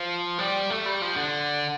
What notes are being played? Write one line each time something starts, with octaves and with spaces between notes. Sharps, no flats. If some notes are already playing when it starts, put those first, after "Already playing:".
Already playing: F3
G3
A3
G3
F3
D3